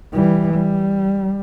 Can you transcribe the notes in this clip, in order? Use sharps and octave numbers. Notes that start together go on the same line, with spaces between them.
E3 G3
G3